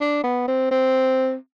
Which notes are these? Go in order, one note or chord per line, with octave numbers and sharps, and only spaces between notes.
D4
B3
C4
C4